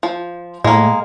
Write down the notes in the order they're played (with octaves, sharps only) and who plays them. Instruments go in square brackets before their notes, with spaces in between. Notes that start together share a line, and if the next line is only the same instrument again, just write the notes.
[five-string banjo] F3
[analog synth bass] A2 [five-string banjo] G#3 A#3